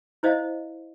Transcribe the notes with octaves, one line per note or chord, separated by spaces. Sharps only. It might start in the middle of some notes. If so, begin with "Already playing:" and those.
E4 C5 D#5 F5